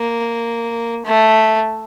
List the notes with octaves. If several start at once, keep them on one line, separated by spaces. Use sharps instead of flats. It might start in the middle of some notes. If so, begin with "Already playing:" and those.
Already playing: A#3
A3